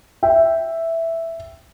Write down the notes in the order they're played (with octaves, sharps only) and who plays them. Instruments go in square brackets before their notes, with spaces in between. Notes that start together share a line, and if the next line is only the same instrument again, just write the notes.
[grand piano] E5 G5